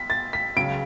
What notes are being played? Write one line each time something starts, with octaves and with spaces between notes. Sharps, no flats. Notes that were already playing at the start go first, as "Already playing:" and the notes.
Already playing: B6
A6
B6
C#2 C#3 F#3 D7